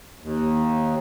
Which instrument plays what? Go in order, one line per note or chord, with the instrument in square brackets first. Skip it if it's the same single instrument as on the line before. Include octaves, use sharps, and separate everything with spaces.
[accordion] D#2